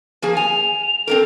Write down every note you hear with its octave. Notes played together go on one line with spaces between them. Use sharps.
F3 A#3 G#4
G#5 F7
C4 D4 A4 A#4